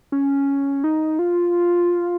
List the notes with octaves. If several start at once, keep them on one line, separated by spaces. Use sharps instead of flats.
C#4
D#4
F4